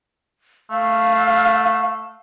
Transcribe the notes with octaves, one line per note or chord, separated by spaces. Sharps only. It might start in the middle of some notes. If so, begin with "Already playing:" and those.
A3 F5